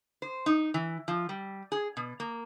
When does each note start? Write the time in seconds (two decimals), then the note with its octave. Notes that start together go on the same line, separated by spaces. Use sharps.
0.22 C5
0.46 D#4
0.74 E3
1.08 F3
1.29 G3
1.72 G#4
1.97 B2
2.20 A#3